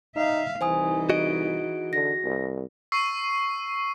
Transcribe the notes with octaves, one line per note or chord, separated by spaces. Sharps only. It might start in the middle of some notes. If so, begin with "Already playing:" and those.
D#4 E5 F5
C2 E3 D#4 C5 G#5 D#6
F#4 G#4 D#5 D7
D3 A#6
C2
C#6 E6 C7 D#7